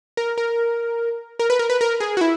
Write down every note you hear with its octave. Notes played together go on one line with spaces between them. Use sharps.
A#4
A#4
A#4
B4
A#4
B4
A#4
G#4
F#4
E4